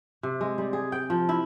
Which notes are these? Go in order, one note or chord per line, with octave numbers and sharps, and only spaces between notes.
C3
G#3
G3
G#4
G5
F3
E4